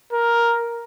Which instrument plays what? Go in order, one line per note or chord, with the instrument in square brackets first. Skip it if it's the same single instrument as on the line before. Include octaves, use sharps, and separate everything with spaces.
[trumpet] A#4